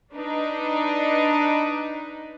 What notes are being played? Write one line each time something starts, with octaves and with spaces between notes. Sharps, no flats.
D4 D#4 B4